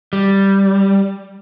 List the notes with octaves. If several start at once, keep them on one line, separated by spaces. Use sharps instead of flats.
G3